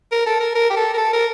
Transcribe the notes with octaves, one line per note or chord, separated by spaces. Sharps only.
A#4
A4
A#4
A#4
G4
A4
A#4
A4
A#4